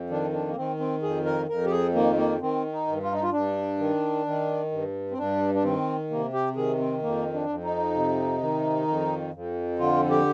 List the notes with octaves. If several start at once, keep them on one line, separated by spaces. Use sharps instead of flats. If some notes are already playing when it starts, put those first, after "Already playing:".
Already playing: F2
D#3 D4
D4
A#3
D#3 C4
C4
F2 G#4
A#4
F2 A#4
G4
G#4
D#3 A#3
A#3
D#3 C4
D#4
G2
F4
D#4
F4
G2 D4
D#3
D#3
G2
C4
G2 D4
D4
D#3 C4
C3 A#3
G4
D#3 G#4
C4
F2 A#3
D4
F2
D#4
C3
D#3
F2
F2
D3 F4
G4